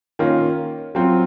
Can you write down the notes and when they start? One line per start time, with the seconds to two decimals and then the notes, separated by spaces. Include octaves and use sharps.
0.19 D#3 A#3 C#4 F4
0.95 F#3 C4 F4